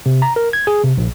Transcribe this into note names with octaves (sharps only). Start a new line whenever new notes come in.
C3
A#5
A#4
G#6
G#4
C3
A#1